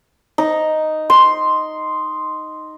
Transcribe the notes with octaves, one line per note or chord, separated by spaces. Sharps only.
D#4
C6